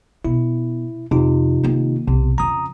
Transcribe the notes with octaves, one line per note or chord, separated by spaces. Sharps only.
B2 E4
F2 C3 D#4 F4
D#3 A#3
B1 C3
F2 C#3 A#5 D#6